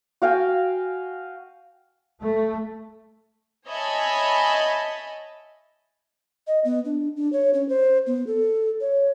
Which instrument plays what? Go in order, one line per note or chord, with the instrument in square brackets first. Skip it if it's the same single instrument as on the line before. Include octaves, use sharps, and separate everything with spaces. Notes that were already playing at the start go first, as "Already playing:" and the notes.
[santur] F#4 F5 G5 G#5
[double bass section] A3
[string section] C#5 D#5 E5 G#5 A5 B5
[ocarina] D#5
B3
D4
D4
C#5
C#4
C5
B3
A4
C#5